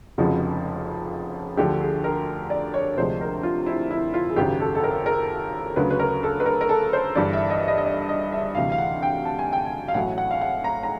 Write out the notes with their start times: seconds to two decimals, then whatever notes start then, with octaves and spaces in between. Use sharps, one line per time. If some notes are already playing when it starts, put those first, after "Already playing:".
0.18 F1 F2 C#3 F3 G#3 F#4
1.57 D2 D3 F3 G4
1.81 G#4
2.04 A#4
2.50 D5
2.74 C#5
2.97 D2 C3 F3 G#3 C5
3.21 A#4
3.43 F4
3.66 E4
3.91 E4
4.14 F4
4.30 G#4
4.36 G#1 F#2 C#3 G4
4.60 A4
4.75 A4
4.84 A#4
5.06 A#4
5.76 D2 C#3 F#3 B4
5.91 B4
5.99 A#4
6.23 A4
6.40 B4
6.46 A#4
6.61 A#4
6.69 A4
6.93 C5
7.15 G1 G2 E3 D5
7.33 E5
7.50 D#5
7.68 D#5
7.78 D#5
7.86 D5
8.09 D#5
8.32 E5
8.55 D2 C3 E3 F5
8.72 F5
8.78 F#5
9.02 G5
9.25 A5
9.39 G#5
9.53 G5
9.66 G#5
9.88 F5
9.94 A1 A2 F#3 F#5
10.18 F#5
10.31 F5
10.41 F#5
10.64 A#5
10.83 A#5